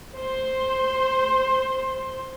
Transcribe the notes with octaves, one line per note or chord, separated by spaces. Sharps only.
C5 C6